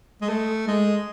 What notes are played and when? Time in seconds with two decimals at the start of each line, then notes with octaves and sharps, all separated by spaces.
0.21 G#3
0.29 A3
0.67 G#3